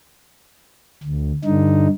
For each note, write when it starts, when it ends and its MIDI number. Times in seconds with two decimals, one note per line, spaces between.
1.04 1.32 38
1.45 1.88 43
1.45 1.88 50
1.45 1.88 63